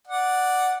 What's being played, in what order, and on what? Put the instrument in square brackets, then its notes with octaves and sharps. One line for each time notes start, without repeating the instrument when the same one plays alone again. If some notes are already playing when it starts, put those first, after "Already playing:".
[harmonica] D5 F#5